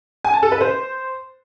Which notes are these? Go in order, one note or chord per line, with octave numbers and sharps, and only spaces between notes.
G#5
A5
A4
B4
C5